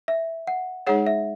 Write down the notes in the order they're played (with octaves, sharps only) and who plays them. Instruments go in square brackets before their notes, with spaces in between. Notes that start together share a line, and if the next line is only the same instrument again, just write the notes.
[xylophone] E5
F#5
[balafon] G#3 D#4 G#4 C#5 [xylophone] F#5
[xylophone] E5